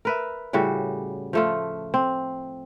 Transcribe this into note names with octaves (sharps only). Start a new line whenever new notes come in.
A#4 B4 E5
A2 C#3 G3 F#4
F3 A3 F4
C4